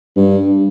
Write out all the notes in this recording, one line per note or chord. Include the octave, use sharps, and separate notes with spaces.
G2